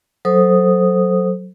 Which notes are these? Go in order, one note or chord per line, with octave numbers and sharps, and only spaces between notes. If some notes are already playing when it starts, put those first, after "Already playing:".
F#3 A4 C5 D#6